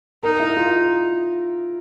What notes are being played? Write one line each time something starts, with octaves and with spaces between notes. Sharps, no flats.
D#4 A#4
E4
F4